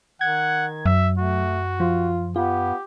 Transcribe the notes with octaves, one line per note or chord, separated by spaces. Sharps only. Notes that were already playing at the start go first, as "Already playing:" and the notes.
D#3 F#5 G#6
F#2 F#3 E5
A3 F#4
F3 F4
B3 F4 G4